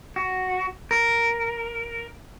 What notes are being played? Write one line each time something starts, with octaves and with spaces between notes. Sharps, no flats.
F#4
A#4